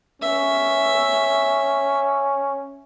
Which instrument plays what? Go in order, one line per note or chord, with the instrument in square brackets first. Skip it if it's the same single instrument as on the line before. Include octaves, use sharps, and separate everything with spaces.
[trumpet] C#4 [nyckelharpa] E5